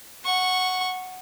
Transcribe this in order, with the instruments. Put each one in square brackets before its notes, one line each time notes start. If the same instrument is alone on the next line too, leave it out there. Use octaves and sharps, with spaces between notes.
[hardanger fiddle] F#5 C#6